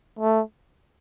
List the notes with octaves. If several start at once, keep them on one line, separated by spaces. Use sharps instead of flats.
A3